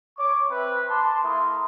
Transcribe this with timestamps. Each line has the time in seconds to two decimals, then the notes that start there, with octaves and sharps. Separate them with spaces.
0.18 C#5 C#6 D6
0.49 C4 B4 E5
0.89 A5 C6 D6
1.23 A3 E4 A#4 F5 C6 D#6